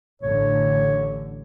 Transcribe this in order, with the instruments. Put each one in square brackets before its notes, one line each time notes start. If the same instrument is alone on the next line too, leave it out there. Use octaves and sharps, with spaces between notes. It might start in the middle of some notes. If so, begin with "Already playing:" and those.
[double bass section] A1 D3 [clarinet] C#5